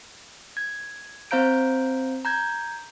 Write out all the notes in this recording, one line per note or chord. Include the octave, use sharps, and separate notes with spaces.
G#6
C4 C5 F5 A#5 G6 D7
A#5 G6 G#6